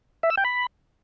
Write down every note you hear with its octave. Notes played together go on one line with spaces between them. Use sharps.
E5
E6
G5
B5